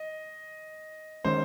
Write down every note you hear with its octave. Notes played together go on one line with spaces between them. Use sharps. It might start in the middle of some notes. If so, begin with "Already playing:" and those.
Already playing: D#5
D#3 G#3 C#4 C5